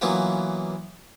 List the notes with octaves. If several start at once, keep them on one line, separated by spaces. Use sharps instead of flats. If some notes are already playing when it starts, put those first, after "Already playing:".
E3 F#3 A#3 B3 C#4 F4